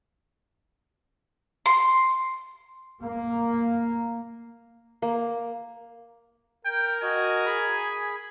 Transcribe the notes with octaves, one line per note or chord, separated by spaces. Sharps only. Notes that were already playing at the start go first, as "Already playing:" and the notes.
C6
A#3
A#3
A#4 G5
F#4 D#5 G#5
G#4 B5